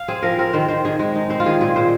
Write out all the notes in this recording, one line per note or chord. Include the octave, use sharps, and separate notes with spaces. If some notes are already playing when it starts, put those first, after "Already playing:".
Already playing: F5
C4 G#4
F3 A#4
C4 A#4
D#3 C5
D#3 C5
D#3 G#4
G#3
D#4
C4 C5
F4
D#3 G#4
A#2 G#4
A#2 C5